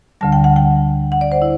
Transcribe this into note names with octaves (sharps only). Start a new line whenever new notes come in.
D2 D3 G3 A5
G5
F#5
G5
F#5
D5
C5
E4